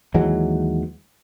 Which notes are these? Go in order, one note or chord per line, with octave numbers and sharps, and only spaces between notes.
D#2 E3 F#3 G#3